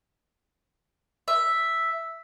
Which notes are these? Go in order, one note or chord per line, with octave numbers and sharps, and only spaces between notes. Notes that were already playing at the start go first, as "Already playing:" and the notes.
E5